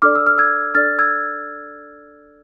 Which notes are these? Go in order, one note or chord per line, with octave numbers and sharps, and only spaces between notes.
D4 A4 D5 D6 F6
E6
F6
E6 G#6
D4 A4 D5 F6 A6
E6 G#6